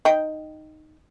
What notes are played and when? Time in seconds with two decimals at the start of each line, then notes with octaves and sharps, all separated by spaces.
0.05 D#4 G5